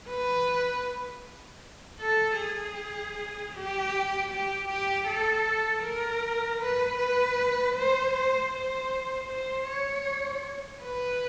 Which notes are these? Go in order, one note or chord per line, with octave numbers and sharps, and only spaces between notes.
B4
A4
G#4
G4
G4
G4
A4
A#4
B4
B4
C5
C5
C5
C5
C#5
B4